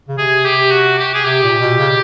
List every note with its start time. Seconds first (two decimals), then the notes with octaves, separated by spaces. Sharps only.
0.09 C#3
0.18 C3 G#4
0.45 G4
0.71 F#4
0.98 G4
1.15 G#4
1.25 C3 G4
1.43 A#2
1.60 B2
1.78 C#3